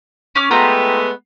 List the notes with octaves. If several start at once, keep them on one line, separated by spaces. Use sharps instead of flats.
C#4 D6 F6
G#3 A3 B3 F4 G4 A#5